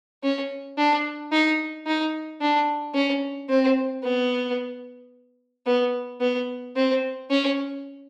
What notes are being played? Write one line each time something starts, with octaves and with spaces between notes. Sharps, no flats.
C#4
D4
D#4
D#4
D4
C#4
C4
B3
B3
B3
C4
C#4